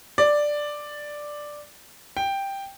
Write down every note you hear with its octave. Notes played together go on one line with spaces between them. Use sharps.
D5
G5